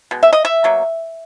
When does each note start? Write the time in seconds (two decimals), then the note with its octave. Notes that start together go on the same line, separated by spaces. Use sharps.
0.11 B2 G#3
0.23 E5
0.33 D#5
0.45 E5
0.64 B2 F#3 A#3